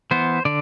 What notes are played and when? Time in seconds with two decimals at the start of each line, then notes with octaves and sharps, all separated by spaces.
0.11 E3 B3 C5
0.45 D3 D5